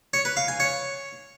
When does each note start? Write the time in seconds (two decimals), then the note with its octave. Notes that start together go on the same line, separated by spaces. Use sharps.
0.14 C#5
0.25 B4
0.37 F5
0.48 G#5
0.60 C#5